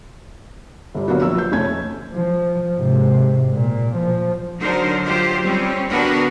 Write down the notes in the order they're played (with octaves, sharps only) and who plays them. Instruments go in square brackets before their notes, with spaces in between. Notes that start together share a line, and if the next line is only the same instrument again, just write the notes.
[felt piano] G1 G3
F#3 A#3 B3 D4 F#4
A#1 E6
G6
F1 A3 C#4 G#6
[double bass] F3
G#2 C3
A#2
F3
[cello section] D3 F#3 D#4 A#4 C5
F#3 F4 G4 C5
G3 C4 C#4
D3 B3 D4 F#4 A#4 B4